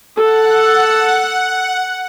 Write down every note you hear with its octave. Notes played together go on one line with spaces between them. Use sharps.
A4 F#5